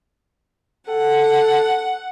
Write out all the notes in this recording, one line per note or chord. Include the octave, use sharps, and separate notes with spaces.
A4 F#5